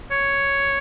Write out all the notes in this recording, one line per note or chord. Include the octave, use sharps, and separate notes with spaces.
C#5